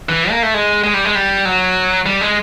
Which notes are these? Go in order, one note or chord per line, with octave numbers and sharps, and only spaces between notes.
E3
A#3
A3
G#3
G#3
G3
G#3
G3
F#3
G3
G#3